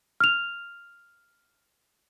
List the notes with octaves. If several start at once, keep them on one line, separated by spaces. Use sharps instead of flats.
F6 F7